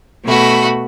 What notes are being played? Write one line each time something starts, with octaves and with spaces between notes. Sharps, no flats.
B2 A3 F#4 B5